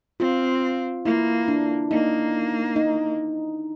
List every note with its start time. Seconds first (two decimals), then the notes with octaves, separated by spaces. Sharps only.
0.20 C4 F4
1.05 A#3 E4
1.48 D4
1.91 A#3 D#4
2.76 D#4